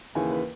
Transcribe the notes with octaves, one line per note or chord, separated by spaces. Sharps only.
D#2 C#3 E3 G#5
B4